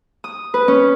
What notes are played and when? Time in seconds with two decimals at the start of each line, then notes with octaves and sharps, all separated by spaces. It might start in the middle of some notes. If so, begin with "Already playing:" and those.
0.24 D#6
0.54 B4
0.68 C#4